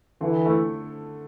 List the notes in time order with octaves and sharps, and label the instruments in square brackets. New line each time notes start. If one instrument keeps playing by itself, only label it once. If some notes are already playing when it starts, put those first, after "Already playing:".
[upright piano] D3 [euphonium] E3
[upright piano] A3 E4